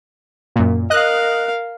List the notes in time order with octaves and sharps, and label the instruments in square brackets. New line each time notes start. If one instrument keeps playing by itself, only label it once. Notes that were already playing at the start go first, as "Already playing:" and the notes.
[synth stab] F#2 A#2
[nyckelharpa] A#4 F5 [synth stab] D#5 F#6